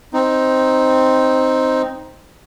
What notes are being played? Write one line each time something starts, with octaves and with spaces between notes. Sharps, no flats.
C4 D#4